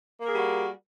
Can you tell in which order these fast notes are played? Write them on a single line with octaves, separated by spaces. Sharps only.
A#3 A#4 G#4 G3 F#4